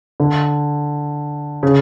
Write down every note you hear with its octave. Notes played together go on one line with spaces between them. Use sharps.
D3
C#3